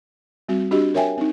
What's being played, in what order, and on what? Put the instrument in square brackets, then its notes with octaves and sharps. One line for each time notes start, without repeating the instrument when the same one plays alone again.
[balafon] G3 C4 F#4
D4 F#4 G4 D#5
A#4 C#5 E5 G5 G#5
C4 D#4